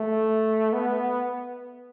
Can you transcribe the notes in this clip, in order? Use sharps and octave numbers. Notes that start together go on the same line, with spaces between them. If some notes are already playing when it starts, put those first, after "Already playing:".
Already playing: A3
B3